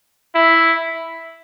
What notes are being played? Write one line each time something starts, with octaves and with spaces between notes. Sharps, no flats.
E4